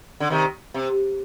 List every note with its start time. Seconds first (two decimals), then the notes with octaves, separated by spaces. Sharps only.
0.20 D3
0.30 C3 D#3
0.74 C3